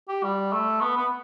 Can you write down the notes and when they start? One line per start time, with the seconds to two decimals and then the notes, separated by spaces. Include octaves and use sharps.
0.08 G4
0.23 G3
0.52 A3
0.81 B3
0.96 B3